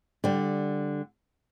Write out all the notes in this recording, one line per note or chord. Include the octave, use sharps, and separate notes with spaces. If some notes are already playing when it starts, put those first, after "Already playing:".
D3 G3